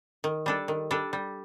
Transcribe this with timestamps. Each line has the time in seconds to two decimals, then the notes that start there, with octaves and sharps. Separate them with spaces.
0.24 D#3
0.46 G3 D4 A4
0.68 D#3
0.91 G3 D4 A4
1.13 G3